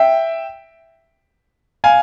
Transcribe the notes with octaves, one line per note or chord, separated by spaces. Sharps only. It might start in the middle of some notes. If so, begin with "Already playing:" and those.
Already playing: E5 G5
F5 G#5